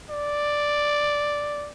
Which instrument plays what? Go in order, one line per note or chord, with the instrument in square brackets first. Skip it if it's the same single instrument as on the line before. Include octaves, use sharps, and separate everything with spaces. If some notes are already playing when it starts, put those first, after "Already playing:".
[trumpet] D5